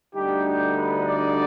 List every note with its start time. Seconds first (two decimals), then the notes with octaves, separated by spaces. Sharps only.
0.15 D2 D3 G3 B3 D#4 G4
0.45 G4
0.76 B4
1.05 D5